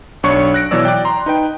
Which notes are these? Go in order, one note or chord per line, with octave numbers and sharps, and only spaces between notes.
B1 D4 C#5 C#6 C#7
F#6 A#6 D7
B2 E3 F#3 C#5 D5 E6
D5 G5
A#5 C6
D#4 B4 G5